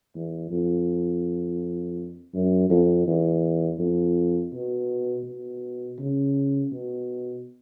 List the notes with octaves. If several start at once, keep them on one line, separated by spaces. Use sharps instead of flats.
E2
F2
F#2
F2
E2
F2
B2
B2
C#3
B2